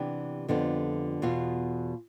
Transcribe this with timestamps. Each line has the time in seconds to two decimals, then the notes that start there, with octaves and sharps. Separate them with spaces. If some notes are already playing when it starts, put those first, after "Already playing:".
Already playing: C3 E3 B3 D4 G4
0.48 F2 D3 G3 B3 F4
1.22 E2 B2 B3 F4